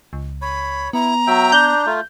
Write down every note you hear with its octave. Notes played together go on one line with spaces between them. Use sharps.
C#2
C#5 B5
B3 E4 A#5
F#3 E5 G5
D4 G6
A3 F4